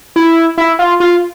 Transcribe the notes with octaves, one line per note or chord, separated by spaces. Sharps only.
E4
E4
F4
F4